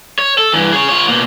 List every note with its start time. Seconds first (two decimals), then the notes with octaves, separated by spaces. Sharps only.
0.19 C#5
0.38 A4
0.53 G2 E3
0.73 G#4 C#5
0.89 F4 C#5
1.08 B2 A#3